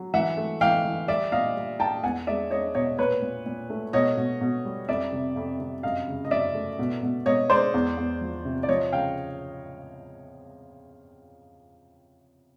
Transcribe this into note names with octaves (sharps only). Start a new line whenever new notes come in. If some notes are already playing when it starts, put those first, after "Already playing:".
Already playing: F#3
E3 E5 F#5
A3
E3 F5 G5
E3
G3 D5 E5
A#2 D#5 F5
G3
A#2 G5 A5
E2 F#5 G#5
G#3 D5 E5
G#3 C#5 D#5
B2 C#5 D#5
A#2 B4 C#5
A#2
A#2
A3
B2 C#5 D#5
B2
B2
G3
F2 D5 E5
C3
F2
C3
F#2 D#5 F5
C#3
D#5
F#2 D5 E5
A3
B2
B2
B2 C#5 D#5
G#3 C5 D5
E2
E2
F3
C3
D5
F3 C#5 D#5
C#3 F5 G5